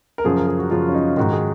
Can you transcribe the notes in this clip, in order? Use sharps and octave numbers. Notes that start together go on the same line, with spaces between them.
A#4
F#2 C#3 F3 G#4
A#4
G#4
F#4
F#2 C#3 F3 F4
C#4
D#4
G#2 D#3 F#4
G#4